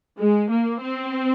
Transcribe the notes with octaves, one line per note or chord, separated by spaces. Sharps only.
G#3
A#3
C4